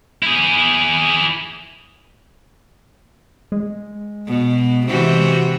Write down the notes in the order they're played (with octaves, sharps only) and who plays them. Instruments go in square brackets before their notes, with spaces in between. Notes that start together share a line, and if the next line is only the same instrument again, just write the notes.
[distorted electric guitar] E4 G#4
[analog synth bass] G#3
[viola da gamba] B2
C3 E3 F#4